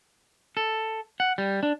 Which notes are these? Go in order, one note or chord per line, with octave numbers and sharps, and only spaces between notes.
A4
F#5
G3
D4